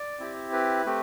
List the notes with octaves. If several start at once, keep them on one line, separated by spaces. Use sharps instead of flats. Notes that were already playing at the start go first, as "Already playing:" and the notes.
Already playing: D5
C4 E4 G4
B4
A3 C4 G4